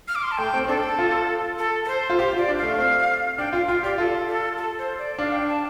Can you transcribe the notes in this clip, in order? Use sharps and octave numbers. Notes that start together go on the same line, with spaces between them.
F6
D6
C6
A5
A3 G5
C4
C4
D4 A4
F4
A4
A4
C5
F4
G4 C5
F4
D5
D4
A3 F5
A3
C4
D4 G5
F4 F5
F4 F5
G4 D5
F4 A4
A4
A4
C5
D5
D4 F5
G5
A5